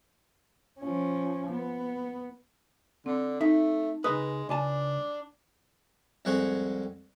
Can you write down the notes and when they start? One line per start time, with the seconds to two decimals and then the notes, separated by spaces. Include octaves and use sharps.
0.80 F3 C#4
1.51 B3
3.06 D3 C4
3.41 A3 D#4 E5
4.04 C#2 G#3 D#4 B4 D#6
4.49 C#2 D4 G#5 A5
6.25 C2 F2 G#3 F#5 C#6